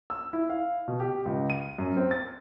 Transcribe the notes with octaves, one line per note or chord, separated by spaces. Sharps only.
E6
E4
F5
B2
G4
C#2
D#7
F#2
C4
A6